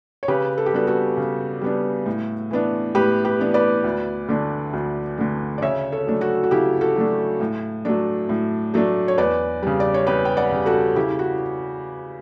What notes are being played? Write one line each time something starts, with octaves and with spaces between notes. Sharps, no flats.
C#5
C#3 G4 B4
A4
G4
G3 B3 D4 F#4 A4
F#4 A4
C#3
G3 B3 D4
A2
E3 B3 D4
A2 G4 B4
G4 B4
E3 B3 D4
B4 D5
D2
D3 A3 D4
D2
D3 A3 D4
D5
C#3 C#5 E5
A4 C#5
F#3 A3 D4
F#4 A4
F#4
C#3 E4 G4
F#4 A4
F#3 A3 D4
A2
F#3 A3 D4
A2
F#3 A3 D4
C#5
E2 B4 D5
C#3 G3
D5
C#5
E2 G4 B4
G5
D5 F#5
C#3 G3
F#4 A4
C#3 E4 G4
E4
F#4